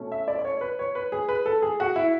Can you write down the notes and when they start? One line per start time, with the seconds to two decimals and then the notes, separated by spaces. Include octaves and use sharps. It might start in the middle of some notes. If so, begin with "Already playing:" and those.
Already playing: B2 A3 C#4
0.12 E5
0.28 D5
0.39 D5
0.45 C#5
0.61 B4
0.79 C#5
0.95 B4
1.12 G#4
1.29 B4
1.46 A4
1.62 G#4
1.80 F#4
1.96 E4